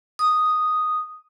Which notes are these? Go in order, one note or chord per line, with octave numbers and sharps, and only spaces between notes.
D#6